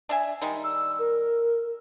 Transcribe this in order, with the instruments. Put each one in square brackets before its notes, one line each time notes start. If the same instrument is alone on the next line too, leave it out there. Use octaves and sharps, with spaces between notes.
[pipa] D4 E5 G#5
D#3 G3 G#3
[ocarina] E6
A#4